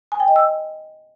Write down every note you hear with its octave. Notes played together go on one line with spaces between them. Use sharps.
G#5
G5
D#5
E6